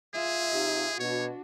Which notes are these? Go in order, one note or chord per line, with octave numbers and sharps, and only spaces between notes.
F4 G#4 E5
C3 D#4 G4
B2 D4 F#4 C#5